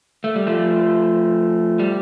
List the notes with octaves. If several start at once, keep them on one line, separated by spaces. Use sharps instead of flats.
A3
G3
F3 A3
G3